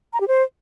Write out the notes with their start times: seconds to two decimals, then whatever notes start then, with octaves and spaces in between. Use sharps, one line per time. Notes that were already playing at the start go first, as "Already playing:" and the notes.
0.13 A#5
0.20 G4
0.28 C5